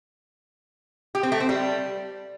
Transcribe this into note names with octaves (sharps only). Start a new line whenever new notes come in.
G4
C4
A3
C4
G3